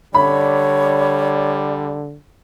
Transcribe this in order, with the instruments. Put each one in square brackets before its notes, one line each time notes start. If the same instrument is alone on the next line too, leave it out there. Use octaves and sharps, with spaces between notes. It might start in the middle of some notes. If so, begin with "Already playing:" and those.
[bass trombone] D3 [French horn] G3 [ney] C#5 [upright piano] B5